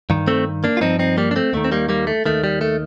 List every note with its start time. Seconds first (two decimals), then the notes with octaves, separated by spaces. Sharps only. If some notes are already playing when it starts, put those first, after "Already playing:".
0.10 G2 D#3
0.28 A3 C4
0.64 A#3 D4
0.77 F4
0.81 G2 F3 C4 D#4
0.99 C4 D#4
1.18 G3 A#3
1.31 D4
1.36 A3 C4
1.53 D#2 D#3 A3
1.64 C4
1.72 G3 A#3
1.89 G3 A#3
2.07 A3
2.26 D#2 D#3 A3
2.44 G3
2.61 A3